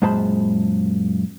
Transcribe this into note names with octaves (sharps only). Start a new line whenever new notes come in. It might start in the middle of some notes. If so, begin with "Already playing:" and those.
F#2 A#2 G#3 C5 A5 B5